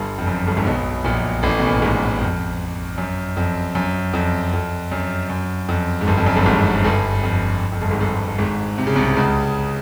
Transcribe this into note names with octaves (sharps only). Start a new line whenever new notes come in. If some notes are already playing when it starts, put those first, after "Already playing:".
Already playing: G1 G2
F2
F#2
G1 G2
G#1 G#2
B1 B2
A#1 A#2
A1 A2
B2
A#2
A2
G#1 G#2
F2
F#2
F2
F#2
F2
F2
F#2
F#2
F2
G#2
G1 G2
F2
F#2
G1 G2
G#1 G#2
G1 G2
F2
F2
G1 G2
G#1 G#2
G1 G2
G#1 G#2
C3
C#3
C2 C3
C#2 C#3